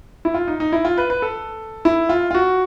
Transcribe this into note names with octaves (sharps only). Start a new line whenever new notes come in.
E4
F4
D#4
D#4
E4
F4
B4
B4
A4
E4
F4
F4
F#4